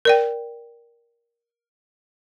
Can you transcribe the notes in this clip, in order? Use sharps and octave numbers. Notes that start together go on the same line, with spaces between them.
A#4 D5 G5